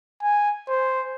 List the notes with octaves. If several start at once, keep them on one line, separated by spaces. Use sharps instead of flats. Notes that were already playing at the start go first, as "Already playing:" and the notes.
G#5
C5